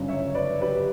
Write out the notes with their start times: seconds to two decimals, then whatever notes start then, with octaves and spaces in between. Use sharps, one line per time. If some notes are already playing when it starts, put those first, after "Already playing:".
Already playing: G1 F#2 C#3 F#3
0.08 C#5 E5
0.35 B4 D5
0.61 G4 B4